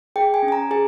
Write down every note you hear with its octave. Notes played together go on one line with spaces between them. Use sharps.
G#4 G5
G#5
C#4
G#5
A#5
G#4 G#5